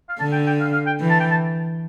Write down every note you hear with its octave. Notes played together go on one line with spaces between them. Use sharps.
F5
D3 A5
G5
G5
F5
F5
G5
E3
A5
G5
A5